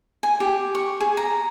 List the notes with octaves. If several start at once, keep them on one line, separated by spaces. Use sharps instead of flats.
G#5
G4
C#6
G#4
A#5